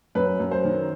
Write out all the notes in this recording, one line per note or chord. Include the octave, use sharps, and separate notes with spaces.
F#2 B4
F#2
C5
D#3